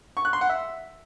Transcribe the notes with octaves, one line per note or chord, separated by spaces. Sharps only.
C#6
F#6
C6
F#5
E5